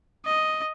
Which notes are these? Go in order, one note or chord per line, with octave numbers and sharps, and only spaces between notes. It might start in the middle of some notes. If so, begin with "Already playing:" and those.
D#5